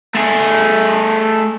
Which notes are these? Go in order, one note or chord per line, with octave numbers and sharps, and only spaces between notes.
A3 G#4